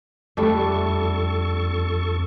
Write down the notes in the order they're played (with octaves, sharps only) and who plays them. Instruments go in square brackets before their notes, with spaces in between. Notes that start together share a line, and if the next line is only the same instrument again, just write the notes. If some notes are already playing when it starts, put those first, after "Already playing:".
[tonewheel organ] F2 A4 C#6 [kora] G3 A3 D4